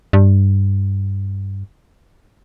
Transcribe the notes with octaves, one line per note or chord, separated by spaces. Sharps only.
G2